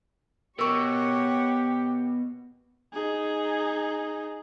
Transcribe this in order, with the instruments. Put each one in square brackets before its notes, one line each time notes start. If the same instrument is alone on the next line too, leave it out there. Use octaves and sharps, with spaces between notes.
[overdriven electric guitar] B2 [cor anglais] G4 [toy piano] A#4 C#6 [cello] C#5 F#5
[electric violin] D#4 G#4